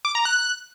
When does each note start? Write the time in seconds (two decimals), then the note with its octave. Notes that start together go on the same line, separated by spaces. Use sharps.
0.05 D6
0.15 A#5
0.25 F#6